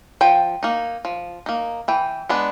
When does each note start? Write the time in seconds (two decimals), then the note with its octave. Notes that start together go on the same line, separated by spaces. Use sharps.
0.21 F3 G5
0.63 A#3 D#4
1.05 F3
1.46 A#3 D#4
1.88 E3 G5
2.29 G#3 B3 D4